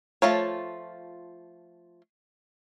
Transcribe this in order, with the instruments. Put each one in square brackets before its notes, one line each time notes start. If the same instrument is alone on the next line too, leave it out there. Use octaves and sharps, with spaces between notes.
[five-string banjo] F3 A3 F4 C#5